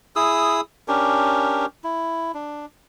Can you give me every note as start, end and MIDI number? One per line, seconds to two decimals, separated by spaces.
0.16 0.61 64
0.16 0.61 68
0.16 0.61 87
0.16 0.61 88
0.88 1.66 61
0.88 1.66 62
0.88 1.66 67
0.88 1.66 70
1.84 2.32 64
2.34 2.66 62